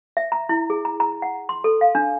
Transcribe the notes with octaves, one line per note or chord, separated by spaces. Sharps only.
E5
A#5
E4
G#4
A#5
A#5
F#5
C6
A4
F5
D4